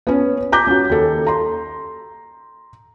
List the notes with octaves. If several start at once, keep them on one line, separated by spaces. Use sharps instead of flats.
B3 C#4
A#5 D6 G6 B6
C#4 F#4
D#2 A4
A#5 C6